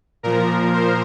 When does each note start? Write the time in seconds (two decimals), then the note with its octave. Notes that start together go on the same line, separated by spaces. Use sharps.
0.23 A#2 F3 A#4
0.74 C5